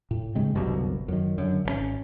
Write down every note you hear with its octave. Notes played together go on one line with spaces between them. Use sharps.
A2
G2 C#3 G#3 C4
G1 C2 F#2 B2
F#2 D#3
F#2 D3
G#1 C#3 C#4